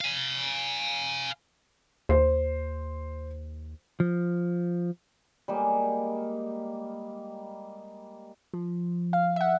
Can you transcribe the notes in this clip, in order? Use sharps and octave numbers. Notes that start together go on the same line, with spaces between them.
F5 G#5
D#2 C5
F3
G3 G#3 A#3
F3
F5
E5 F#5